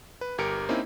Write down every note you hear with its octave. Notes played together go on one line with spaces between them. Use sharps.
B4
G1 G4 A#4 F6 C#7 D7
A#3 C4 C#4 D#4 E4